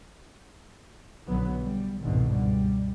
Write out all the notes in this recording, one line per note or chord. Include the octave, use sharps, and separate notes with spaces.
B1 D3 F#3 B3
G3
G1 C2 G#2 B2 D3 D#3
C#2 G3